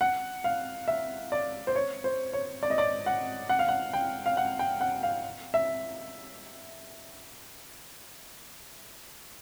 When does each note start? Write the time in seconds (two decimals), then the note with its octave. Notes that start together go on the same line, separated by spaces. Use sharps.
0.01 F#5
0.44 F5
0.88 E5
1.32 D5
1.67 C5
1.75 C#5
2.04 C5
2.33 C#5
2.63 D5
2.70 D#5
2.78 D5
3.06 F#5
3.49 F#5
3.59 F5
3.68 F#5
3.93 G5
4.26 F5
4.37 F#5
4.59 G5
4.81 F#5
5.03 F5
5.54 E5